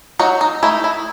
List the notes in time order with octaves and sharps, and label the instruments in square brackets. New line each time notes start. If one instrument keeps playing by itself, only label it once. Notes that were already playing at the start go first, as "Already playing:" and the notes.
[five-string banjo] F#3 D#4 F#4
D#4
A3 D#4 E4
E4